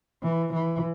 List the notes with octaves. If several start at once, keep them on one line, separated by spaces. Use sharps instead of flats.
E3
E3